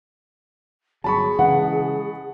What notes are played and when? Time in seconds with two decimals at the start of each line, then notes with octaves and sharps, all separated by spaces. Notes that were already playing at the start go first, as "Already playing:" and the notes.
1.04 G1 F#3 G#4 A5 B5 C#6
1.39 C#3 E3 G#3 F#5